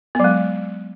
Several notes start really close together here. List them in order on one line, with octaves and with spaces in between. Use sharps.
B3 F#3 G#3